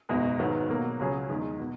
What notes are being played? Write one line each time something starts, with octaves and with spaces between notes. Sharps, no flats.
F#1 E2 B2 G#3 D#4
G#1 G#2 D#3 F#3 B3
B2 F#3 A#3
C#2 C#3 F#3 C#4 G#4
E2 D#3 G#3
B2